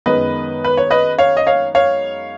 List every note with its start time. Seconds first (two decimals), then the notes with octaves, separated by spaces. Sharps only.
0.06 F#2 D#3 G#3 B3 B4 D#5
0.64 B4
0.77 C#5
0.91 B4 D#5
1.18 C#5 F5
1.37 D#5
1.47 C#5 F5
1.75 C#5 F5